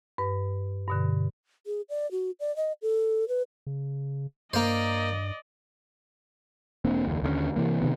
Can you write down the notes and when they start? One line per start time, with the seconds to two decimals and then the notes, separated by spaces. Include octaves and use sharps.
0.18 G2 B4
0.88 G2 B2 D3
1.66 G#4
1.90 D5
2.11 F#4
2.40 D5
2.56 D#5
2.82 A4
3.28 B4
3.67 C#3
4.53 G2 A#3 C5 D5 D#5
6.85 E1 A#3 C4 D4
7.05 F#1 D#2
7.22 D#2 D3 F3 C#4
7.56 C3 E3 A#3
7.81 C3 D#3 B3